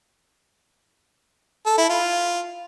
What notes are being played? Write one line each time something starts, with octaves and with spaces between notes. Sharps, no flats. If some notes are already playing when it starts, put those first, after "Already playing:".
A4
E4
F4